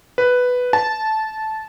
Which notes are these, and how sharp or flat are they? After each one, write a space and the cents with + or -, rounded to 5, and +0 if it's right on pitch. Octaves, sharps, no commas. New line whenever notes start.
B4 +5
A5 -10